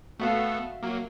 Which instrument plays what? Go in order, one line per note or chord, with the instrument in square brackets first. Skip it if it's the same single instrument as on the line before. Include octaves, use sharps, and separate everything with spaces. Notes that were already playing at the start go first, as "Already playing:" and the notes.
[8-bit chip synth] A3 B3 A4 [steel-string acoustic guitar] F#4 E5 F5
[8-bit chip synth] F#3 A#3